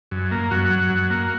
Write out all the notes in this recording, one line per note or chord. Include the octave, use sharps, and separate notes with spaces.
F#2
A#3
F#2 F#4
F#3
F#2
A#3